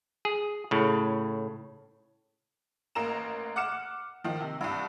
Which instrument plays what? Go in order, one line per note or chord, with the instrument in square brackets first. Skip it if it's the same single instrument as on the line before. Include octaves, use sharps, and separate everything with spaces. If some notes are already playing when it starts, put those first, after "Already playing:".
[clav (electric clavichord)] G#4
A2 C#3
[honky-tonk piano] A1 A#3 A#5 E7
F#5 D6 F6 C#7 E7
D#3 F3
C3
C2 G2